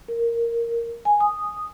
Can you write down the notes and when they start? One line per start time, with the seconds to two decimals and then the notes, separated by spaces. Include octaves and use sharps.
0.08 A#4
1.05 G#5
1.20 D#6